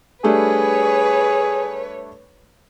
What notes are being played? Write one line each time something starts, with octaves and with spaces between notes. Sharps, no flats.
G3 A3 D4 G#4 B4 C#5